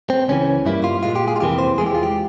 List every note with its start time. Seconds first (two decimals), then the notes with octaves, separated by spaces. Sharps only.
0.10 C4
0.28 C#2 C#3 E3 C#4
0.65 G2 G3 A#3 E4
0.84 F4
1.03 A#2 G#3 F4
1.16 G4
1.28 G#4
1.36 F4
1.40 F2 C3 E3 A#3 G4
1.58 C5
1.78 E2 E3 G#3 G#4
1.86 G4
1.95 F4
2.03 G4